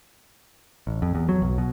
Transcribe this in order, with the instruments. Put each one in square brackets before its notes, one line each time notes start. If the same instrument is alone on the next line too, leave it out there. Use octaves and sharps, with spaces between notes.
[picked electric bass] A1
F2
E2
F#3
B1
B2